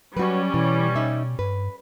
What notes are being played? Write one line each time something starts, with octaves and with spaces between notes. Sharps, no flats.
F#3 G3 C#4 F#4 B4
B2 E3
D#4 E5
G2 B4